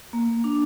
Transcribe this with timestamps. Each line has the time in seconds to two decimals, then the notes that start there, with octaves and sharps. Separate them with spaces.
0.13 A#3
0.44 D4